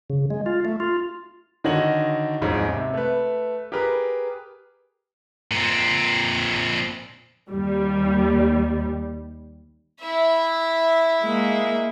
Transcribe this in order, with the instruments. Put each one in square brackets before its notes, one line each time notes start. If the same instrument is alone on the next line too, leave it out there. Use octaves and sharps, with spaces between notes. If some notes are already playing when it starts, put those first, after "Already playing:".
[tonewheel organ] C#3
G#3
F4
A3
F4
[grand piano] D3 D#3 F#4 C#5 D#5 F#7
D#1 F2 G#2 C4 C#4
C3
A3 B4
G4 G#4 A#4 B4
[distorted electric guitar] A#2 C4
[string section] D#2 G3
[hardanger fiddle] E4 E5
[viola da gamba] G#3 A#3